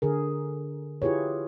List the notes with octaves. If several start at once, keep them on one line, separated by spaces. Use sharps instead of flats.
D3 G#4 A#4
E4 F4 G4 G#4 B4 C#5